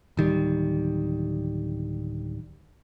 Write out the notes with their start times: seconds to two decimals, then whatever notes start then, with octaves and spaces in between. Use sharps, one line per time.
0.17 D1 D#3 G3